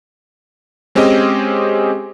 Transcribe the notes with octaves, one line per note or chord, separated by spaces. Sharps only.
G#3 C4 C#4 G4 G#4 D#5